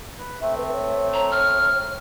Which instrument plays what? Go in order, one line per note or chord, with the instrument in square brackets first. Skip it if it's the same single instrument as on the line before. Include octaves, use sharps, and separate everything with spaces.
[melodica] B4
[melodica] A3 C4 [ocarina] E5
[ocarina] B4
C#5
[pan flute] A#5
F6